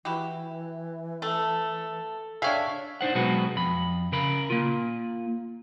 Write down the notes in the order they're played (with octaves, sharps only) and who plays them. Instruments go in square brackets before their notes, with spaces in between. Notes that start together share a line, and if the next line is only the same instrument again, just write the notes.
[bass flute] E3 [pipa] E4 F#4 G4
[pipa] A3 [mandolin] A4
[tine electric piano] D4 C#5 E5 [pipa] G#4 F5 G5
[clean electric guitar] D4 D#4 C5 F#5
B2 F#3 G#3 C4 F#4 B4
F2 B5
C#3 A#4 B5
A#3 F4